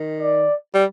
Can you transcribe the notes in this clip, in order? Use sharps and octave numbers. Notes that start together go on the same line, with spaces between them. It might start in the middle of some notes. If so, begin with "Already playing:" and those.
Already playing: D#3
D5
G3